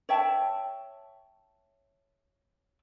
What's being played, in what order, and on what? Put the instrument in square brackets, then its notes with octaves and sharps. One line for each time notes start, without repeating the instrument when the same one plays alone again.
[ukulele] C#5 E5 G5 A5